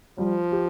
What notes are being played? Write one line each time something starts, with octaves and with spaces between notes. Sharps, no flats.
F3 G3
G4